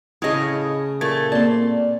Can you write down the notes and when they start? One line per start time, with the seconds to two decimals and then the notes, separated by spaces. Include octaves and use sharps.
0.22 A2 C#3 G#4 C#5 D#5 D#6
1.01 A#2 A3 G#6
1.32 A#3 C4 D5 A5 C6